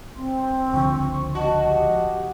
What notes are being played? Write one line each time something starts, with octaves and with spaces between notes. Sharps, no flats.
C4 C6
C#2 D3 F3 C#6
F#4 D#5 A5
G4